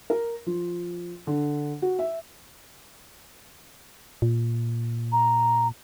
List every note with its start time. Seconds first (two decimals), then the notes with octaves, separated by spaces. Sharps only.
0.10 A#4
0.46 F3
1.27 D3
1.82 F#4
1.99 E5
4.22 A#2
5.12 A#5